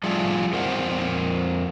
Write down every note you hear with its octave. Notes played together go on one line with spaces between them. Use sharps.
F3 G3 A3 F4 G#4 A4
F2 A#4 C5 F#5